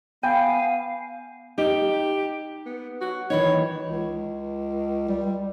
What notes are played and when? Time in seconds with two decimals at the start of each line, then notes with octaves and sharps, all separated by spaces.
0.23 B3 F5 G5 G#5
1.58 D#4 G4
2.66 B3
3.01 F#4
3.30 D#3 E3 D#4 C#5
3.87 C#2
5.09 G3